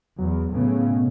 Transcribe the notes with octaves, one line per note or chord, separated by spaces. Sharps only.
E2 F#3
A2 C#3 B3
B2